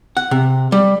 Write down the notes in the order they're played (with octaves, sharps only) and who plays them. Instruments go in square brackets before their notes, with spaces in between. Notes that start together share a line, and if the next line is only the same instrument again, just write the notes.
[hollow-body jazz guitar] F#5
C3
G3